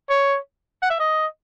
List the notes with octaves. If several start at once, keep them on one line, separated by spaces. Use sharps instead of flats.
C#5
F#5
E5
D#5